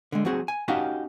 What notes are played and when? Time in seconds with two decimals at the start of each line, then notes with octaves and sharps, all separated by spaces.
0.12 D3 G#3
0.25 F#3 C4 F#4 G#4
0.48 G#5
0.68 C#4 D#4 F#4 G4 F5 F#5